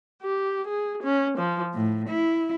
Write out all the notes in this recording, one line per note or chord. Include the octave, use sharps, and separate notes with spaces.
G4
G#4
C#4
F3
A2
E4